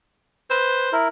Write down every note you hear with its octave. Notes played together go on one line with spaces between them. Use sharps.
B4 C5
E4 A#4